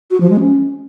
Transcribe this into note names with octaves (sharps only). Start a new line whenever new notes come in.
F#4
F3
G#3
C#4